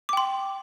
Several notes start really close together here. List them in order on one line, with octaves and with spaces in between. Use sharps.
D6 G5 C6